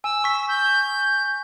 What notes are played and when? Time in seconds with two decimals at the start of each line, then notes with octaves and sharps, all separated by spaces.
0.04 G#5 E6
0.24 C#6 B6
0.49 G6